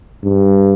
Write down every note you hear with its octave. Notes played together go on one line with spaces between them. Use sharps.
G2